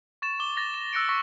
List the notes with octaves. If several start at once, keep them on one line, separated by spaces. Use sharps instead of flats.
C#6 A6 E7
D6 G7
A6 A#6 F7
E7
E6 F#6 A#6 C#7 D7
C#6 A#6 B6